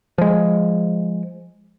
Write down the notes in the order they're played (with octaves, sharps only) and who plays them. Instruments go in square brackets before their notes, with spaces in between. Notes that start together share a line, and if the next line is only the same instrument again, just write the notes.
[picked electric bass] F3 G#3